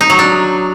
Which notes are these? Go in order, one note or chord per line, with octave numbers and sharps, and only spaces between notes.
D#4
F#3
D4